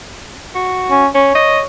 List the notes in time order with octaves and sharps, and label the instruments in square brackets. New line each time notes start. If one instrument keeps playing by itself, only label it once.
[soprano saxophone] F#4
[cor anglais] C#4
[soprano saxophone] C#4 [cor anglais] C#5
[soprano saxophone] D#5